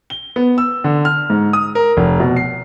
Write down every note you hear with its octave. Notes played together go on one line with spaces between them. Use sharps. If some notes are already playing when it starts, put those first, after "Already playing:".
G7
B3
E6
D3
F6
G#2
D#6
A#4
F1
B2
C7